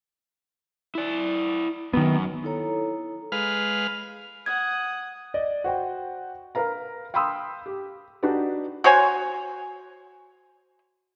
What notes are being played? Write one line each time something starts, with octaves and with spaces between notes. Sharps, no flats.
E4 D5
F#2 D#3 B3
D#4 E4 A4 C#5 A#5
G#3 B4 F5 F6
F#5 D#6 G#6
D5 D#5
F#4 C5 G5
A#4 B4 F5 A#5
F5 G5 B5 C6 D#6 E6
G4
D4 D#4 F#4 G4 B4 D5
F#4 C5 C#5 G#5